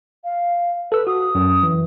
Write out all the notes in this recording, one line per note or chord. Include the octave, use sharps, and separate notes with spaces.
F5
A4 B4 E6
F#4 D#6
F#2
E3